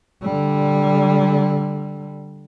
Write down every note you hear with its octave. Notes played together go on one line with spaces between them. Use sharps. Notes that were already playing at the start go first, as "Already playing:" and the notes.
D3 G3